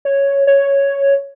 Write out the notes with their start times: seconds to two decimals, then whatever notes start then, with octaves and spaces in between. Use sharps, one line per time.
0.05 C#5
0.47 C#5